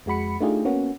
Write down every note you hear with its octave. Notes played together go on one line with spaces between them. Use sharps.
F2 G#3 F#4 B5 C#7
A3 D4 D#4 F4 G4 G#4
A#3 B3 C#4 F#4